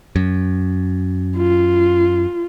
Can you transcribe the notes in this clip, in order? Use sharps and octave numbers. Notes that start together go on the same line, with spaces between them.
F#2
F4